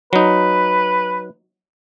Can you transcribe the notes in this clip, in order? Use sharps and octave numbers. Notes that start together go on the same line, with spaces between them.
F#3 D#4 B4